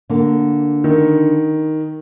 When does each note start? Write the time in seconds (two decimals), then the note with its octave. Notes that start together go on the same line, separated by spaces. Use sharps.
0.10 D3 A#3
0.84 D#3